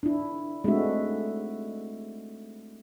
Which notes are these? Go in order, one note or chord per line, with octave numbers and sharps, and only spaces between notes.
D4 E4
G#3 A3 C4 D4 F#4 E5